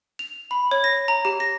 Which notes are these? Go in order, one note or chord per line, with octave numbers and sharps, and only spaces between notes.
F7
B5
C#5
A#6
A#5
G4
A#6